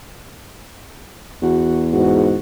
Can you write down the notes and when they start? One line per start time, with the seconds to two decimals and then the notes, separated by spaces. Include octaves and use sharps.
1.42 E2 F#4
1.92 G#2 F#4